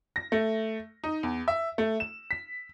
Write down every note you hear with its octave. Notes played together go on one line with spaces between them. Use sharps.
A#6
A3
D#4
E2
E5
A3
E7
B6